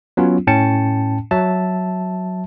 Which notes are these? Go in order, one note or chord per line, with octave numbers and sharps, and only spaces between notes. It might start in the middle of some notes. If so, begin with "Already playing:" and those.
F#3 B3 C#4 F4
A2 C#4 G5 A5 C#7
F#3 E5 A5